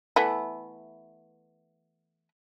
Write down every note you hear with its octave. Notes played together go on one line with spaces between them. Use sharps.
E3 A3 B3